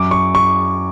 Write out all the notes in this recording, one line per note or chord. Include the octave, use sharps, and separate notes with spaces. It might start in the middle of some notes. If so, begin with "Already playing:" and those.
Already playing: F#2 D6
C#6
C#6